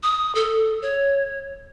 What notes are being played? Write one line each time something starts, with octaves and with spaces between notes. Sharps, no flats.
D#6
A4
C#5